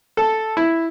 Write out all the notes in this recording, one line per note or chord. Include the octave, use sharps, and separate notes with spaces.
A4
E4